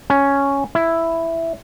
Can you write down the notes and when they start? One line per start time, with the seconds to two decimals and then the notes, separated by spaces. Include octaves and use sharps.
0.10 C#4
0.75 E4